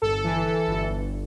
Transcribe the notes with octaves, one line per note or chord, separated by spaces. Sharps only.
G1 A4
E3
E3
G1
G1